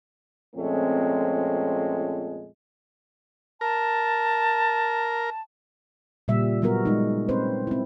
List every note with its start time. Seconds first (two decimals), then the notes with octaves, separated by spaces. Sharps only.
0.55 F2 A#2 G#3 A3 C4 C#4
3.61 A#4 A5
6.28 A#2 C#3 G3 E5
6.62 F#3 G3 B3 F#4 A#4
6.85 G#3 D#4
7.29 C4 C#4 B4 C5
7.67 C4 E4